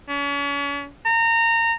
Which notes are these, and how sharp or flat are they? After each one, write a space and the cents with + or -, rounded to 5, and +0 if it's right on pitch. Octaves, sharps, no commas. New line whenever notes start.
C#4 +40
A#5 -25